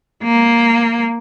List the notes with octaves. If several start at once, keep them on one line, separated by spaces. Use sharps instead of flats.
A#3